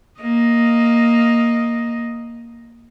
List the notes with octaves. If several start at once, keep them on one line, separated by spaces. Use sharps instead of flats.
A#3 D#5